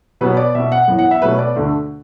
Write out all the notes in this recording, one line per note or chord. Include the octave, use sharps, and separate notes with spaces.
B2 F#3 B3 B4
D5
B2 B3 E5
F#5
F#2 E3 B3
F#5
E5
B2 F#3 A3 B4
D5
D2 D3 A3